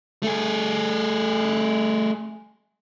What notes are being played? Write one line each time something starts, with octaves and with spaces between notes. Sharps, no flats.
A3 G#4